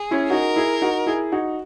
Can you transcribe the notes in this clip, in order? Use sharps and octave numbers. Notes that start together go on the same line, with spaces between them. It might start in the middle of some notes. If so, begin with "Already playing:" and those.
Already playing: G#4
C#4 E4
D#4 F#4 A#4
E4 G#4
D#4 F#4
E4 G#4
D#4 F#4